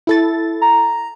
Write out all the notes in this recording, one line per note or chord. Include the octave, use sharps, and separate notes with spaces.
E4 A4 A6
A#5